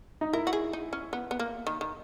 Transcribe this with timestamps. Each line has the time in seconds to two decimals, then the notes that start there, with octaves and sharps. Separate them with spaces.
0.21 D#4
0.33 E4 A#4
0.47 F#4
0.53 G#4
0.73 D#4
0.93 C#4
1.13 B3
1.31 B3
1.39 A#3
1.67 D#3
1.81 D#3